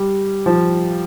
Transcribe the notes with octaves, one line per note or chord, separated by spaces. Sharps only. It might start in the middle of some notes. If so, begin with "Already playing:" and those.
Already playing: G3
F3